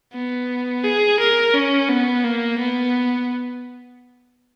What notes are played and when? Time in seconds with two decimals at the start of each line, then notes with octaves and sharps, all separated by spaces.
0.14 B3
0.84 G#4
1.20 A#4
1.54 C#4
1.89 B3
2.24 A#3
2.59 B3